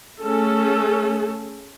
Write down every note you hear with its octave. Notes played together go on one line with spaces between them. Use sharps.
A3 C#4 G#4 A4